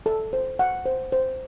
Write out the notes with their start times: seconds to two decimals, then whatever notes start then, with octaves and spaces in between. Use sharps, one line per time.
0.06 A4
0.33 C5
0.59 F#5
0.86 C5
1.12 C5